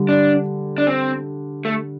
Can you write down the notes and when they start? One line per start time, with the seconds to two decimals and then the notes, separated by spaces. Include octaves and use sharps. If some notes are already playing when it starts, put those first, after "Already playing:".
Already playing: D3 G3
0.09 D4
0.78 D4
0.87 C4
1.65 A3